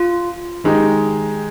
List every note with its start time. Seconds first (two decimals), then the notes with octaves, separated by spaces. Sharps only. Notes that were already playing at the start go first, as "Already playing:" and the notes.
Already playing: F4
0.64 D#3 G#3 D#4 G4